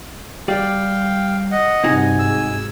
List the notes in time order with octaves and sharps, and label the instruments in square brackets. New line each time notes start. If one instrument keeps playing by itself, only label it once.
[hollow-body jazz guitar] G3 G4 D5 [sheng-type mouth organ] F5 G5
[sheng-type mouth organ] D#5 F#5
[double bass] G2 C3 [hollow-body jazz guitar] C4 D#4 F#4 [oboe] G#5
[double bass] G#2 [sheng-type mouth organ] E6